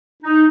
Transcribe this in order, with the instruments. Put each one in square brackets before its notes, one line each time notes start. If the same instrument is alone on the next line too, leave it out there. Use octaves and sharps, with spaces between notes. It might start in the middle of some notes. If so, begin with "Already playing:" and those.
[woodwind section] D#4